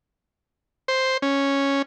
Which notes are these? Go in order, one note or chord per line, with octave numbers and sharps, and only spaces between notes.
C5
C#4